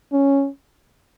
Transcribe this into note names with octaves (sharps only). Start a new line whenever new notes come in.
C#4